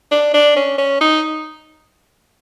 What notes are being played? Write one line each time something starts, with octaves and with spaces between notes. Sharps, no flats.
D4
D4
C#4
C#4
D#4